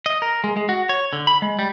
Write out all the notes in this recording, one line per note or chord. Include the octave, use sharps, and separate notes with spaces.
D#5
A#4
G#3
G#3
F#4
C#5
D3
B5
G#3
G3